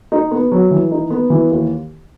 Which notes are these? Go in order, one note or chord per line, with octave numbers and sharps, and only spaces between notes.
D#4
B3
F#3
E3
D#4
B3
E3
D#2